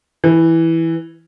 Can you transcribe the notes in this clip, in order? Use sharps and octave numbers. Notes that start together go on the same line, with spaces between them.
E3